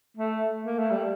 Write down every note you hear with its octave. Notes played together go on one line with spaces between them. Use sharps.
A3
A#3
A3
G3